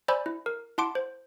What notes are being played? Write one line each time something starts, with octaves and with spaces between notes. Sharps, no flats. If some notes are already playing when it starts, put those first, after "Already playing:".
C5 D5 G#5 B5 E6 G6
E4
A#4
E4 F#5 A5 C6 D6 D7
C5